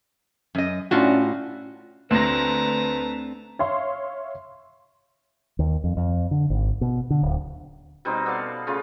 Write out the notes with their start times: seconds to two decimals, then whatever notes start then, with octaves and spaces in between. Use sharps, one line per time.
0.55 F#2 D#5
0.91 A2 C#4 D4 F4 F#4
2.11 D2 A3 C4 D4 B4 A5 A#5 A#6
3.59 C#5 E5 F5 C6
5.59 D#2
5.84 F2
5.97 F2
6.31 D3
6.50 G#1
6.81 B2
7.10 D3
7.23 D1
8.05 B2 G3 C4 D#4
8.26 B3 A4 D5 F5
8.67 C#3 A3 F4